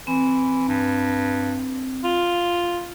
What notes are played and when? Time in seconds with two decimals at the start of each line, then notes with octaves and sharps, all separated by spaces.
0.07 E3 C4
0.68 G2
2.04 F4